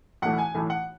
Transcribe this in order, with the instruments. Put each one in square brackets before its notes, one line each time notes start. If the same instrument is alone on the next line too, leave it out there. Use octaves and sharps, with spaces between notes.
[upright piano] B1 A2 E3 A3 E4 F#5
G#5
B1 A2 E3 A3 E4
F#5